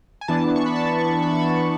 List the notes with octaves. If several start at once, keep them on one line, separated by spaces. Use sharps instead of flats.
G#5
E3 B3 D4 A5
C#6
B5
A5
C#6
B5
C#6
B5